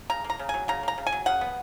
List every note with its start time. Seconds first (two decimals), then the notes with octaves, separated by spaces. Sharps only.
0.10 C#3 A#5
0.24 A#3
0.30 A#5
0.39 C#3
0.49 F#3 G#5
0.68 C#3 A#5
0.83 A#3 A#5
0.98 C#3
1.07 G#5
1.12 F#3
1.26 C#3 F#5
1.41 B3